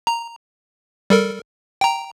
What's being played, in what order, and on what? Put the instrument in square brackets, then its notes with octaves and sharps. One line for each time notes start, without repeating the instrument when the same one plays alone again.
[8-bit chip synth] A#5
G3 A4 A#4
G5 A#5